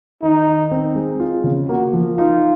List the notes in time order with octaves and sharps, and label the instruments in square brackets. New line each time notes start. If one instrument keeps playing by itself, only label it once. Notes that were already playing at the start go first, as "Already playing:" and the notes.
[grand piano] D#3 [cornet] D#4
[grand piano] D#3
C4
G#3
F4
C#3
[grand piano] A#3 [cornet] F#4
[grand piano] F3
[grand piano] D#4 [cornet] F4